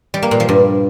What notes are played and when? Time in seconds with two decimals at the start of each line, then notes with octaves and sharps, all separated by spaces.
0.14 G3
0.23 A#3
0.31 A#2
0.40 F3
0.49 G2